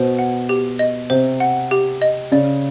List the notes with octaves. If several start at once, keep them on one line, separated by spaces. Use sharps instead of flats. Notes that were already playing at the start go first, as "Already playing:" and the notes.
Already playing: B2 C5
F#5
G4
D#5
C3 C5
F#5
G4
D#5
C#3 D5